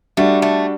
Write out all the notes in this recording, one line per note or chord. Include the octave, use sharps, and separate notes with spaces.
G3 A3 D4 F#4
A3